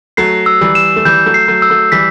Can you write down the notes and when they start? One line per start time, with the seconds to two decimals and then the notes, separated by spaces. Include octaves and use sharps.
0.17 F#3 A3 C7
0.46 E6
0.61 E3 G3
0.75 E7
0.96 A3
1.05 E3 G3 G6
1.26 F#3 A3
1.34 C7
1.48 F#3 A3
1.62 E6
1.70 F#3 A3
1.92 E3 G3 B6